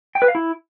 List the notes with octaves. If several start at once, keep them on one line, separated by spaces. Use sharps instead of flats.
G5
B4
F5
E4